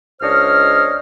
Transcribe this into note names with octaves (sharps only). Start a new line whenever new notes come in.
C#2 D4 C5 C#5 D#5 F6